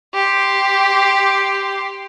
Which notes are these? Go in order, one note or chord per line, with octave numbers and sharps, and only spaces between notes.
G4 C6